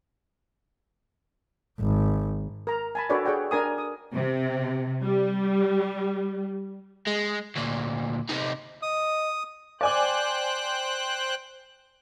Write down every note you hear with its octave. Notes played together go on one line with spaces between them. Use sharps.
G#1
A#4 A#5
G#5 A5 B5
D4 F#4 A4 B4 C#5 D5
G#4 C#5 D5 F#5 G5
D4 A#4 G#5 D#6
D#6
C3
G3
G#3
D2 A#2
C3 D#4
D#5 D#6
C5 D5 G5 G#5 D6 F#6